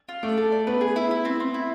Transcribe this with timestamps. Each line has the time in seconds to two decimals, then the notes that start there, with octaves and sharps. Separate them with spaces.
0.09 F4
0.23 A3 D5
0.37 A4
0.52 D5
0.67 B3 B4
0.81 G#4
0.96 E4
1.11 E4
1.25 C4
1.40 C4
1.54 E4